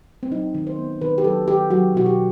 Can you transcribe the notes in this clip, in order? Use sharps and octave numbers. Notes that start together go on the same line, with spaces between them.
C4
F#3 D#4
D#3
C5
B3
D#3 B4
G4
F#3 A4
D#3 G4
F#3 F#4
B2 F#4
G4